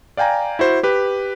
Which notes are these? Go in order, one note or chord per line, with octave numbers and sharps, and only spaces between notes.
D5 F5 G5 G#5 A#5
E4 F#4 C5
G4 B4